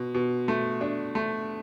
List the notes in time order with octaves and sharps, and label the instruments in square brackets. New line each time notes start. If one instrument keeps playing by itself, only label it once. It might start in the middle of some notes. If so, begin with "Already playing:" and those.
Already playing: [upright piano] B2
B2
A3
D4
A3